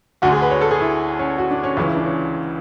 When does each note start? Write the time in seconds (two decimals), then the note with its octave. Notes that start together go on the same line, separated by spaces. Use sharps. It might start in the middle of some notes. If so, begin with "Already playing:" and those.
0.22 D2 D3 F#4
0.32 G#4
0.42 B4
0.51 C#5
0.61 A4
0.71 G#4
0.81 E4
1.19 C#4
1.38 F#4
1.51 D4
1.63 C#4
1.77 C#2 C#3 E3 C#4
1.86 E4
1.96 D4
2.05 C#4